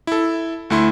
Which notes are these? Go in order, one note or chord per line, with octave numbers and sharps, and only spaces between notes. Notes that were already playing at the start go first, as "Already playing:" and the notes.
E4 A4
D2 A3 E4 C6